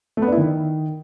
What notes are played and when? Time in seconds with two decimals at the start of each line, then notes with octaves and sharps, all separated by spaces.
0.17 A3
0.22 B3
0.27 D4
0.32 E4
0.38 D#3